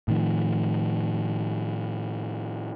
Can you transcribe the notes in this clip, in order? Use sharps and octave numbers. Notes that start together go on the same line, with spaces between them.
A2 D#3 F3